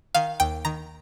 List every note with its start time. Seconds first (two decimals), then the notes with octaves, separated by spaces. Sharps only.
0.15 D#3 F5
0.40 D#2 G5
0.65 D#3 A#5